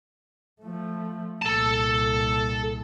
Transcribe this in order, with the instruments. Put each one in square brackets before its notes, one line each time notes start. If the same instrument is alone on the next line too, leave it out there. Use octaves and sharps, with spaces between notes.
[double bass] F3 A3
[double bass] C2 A#2 [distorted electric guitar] A4 A5